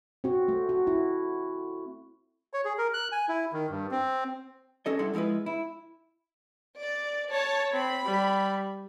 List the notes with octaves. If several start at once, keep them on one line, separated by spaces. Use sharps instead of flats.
C4 F#4
A3
F#4
E4
C#5
G#4
A#4
F#6
G#5
E4
D#3
G2
C4
C#4 A4 D#5
G2 E4 A4 F#5 C6
F3 G#3 E4 F4 B4
E4
D5
C#5 A5
C4 B5
G3